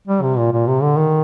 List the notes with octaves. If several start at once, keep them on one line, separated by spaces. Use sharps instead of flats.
G3
C3
A#2
A#2
C3
D3
D#3